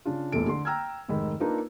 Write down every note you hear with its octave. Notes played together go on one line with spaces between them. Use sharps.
C#3 D4 F4
F1 B1 E2 A#2 A4 D7
D3 C6
G5 A#5 E6 F6 G#6
F1 G#2 D#3 B5
A#3 D4 D#4 F4 A#4 B4